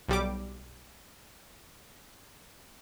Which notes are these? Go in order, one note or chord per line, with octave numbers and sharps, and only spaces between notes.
B1 G3 D6